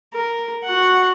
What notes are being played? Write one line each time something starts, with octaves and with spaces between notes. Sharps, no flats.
A#4
F#4 F#5